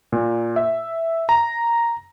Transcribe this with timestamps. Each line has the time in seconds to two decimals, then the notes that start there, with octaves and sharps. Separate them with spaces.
0.12 A#2
0.56 E5
1.29 A#5